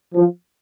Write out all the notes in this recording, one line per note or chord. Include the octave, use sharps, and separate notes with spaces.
F3